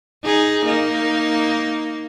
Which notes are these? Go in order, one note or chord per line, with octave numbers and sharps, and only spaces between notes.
D#4 G#4
A#3 D#4